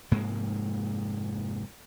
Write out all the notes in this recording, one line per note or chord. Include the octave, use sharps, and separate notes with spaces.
F1 G#2 G#3 A#3